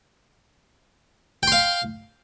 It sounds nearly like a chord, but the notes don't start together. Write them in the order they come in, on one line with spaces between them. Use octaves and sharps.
G5 C6 F5